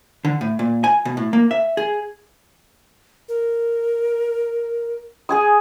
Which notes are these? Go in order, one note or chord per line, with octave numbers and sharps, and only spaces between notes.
D3
A2
A#2
G#5
B2
A2
A#3
E5
G#4
A#4
G#4 G#5 D#6